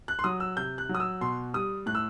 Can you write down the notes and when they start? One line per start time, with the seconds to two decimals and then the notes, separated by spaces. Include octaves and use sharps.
0.08 F#6
0.19 C6
0.24 F#3 D#6
0.40 E6
0.57 C3 G6
0.78 F#6
0.89 F#3
0.95 D#6
1.00 E6
1.21 B2 C6
1.54 G3 D#6
1.86 A2 F#6
1.95 E6